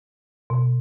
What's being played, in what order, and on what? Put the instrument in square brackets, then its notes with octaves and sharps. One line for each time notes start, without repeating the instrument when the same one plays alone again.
[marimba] B2